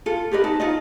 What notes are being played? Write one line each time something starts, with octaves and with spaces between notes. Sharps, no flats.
F4 A4
G4 A#4 B4 D#5
D#4 A5
D#4 F4 D#5